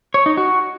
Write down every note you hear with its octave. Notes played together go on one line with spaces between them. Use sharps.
C#5
D#4
F#4